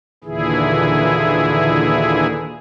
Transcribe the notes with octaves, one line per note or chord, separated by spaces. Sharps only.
D#2 A#2 D3 E3 E4 G#4